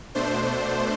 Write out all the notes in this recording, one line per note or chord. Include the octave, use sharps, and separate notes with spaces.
B2 A3 D4 C5